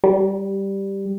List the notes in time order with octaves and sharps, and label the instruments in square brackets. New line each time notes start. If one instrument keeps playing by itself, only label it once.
[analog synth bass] G3